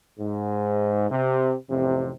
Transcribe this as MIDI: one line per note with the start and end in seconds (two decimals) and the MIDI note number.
0.19 1.09 44
1.10 1.54 48
1.69 2.11 33
1.69 2.11 41
1.69 2.11 48